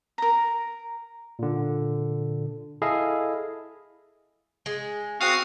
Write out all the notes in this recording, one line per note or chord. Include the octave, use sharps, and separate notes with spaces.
A#4 A#5
A#2 D3
E4 G#4 A4 D#5 F5
G#3
C4 F#4 F5 D#6 C7